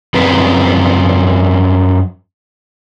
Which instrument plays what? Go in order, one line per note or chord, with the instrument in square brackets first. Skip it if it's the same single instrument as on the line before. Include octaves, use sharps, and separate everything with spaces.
[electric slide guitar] F#2 F3 C4 B4